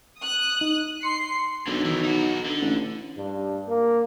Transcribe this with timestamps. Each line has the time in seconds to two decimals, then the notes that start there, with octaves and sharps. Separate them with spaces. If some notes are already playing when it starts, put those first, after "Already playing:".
0.19 D#6 F#6
0.61 D#4
1.03 C6 C7 C#7
1.67 B1 F#2 D3
1.85 D#3 E3
2.04 D#4 F#4
2.46 D3
2.62 A1
3.17 G2
3.68 A#3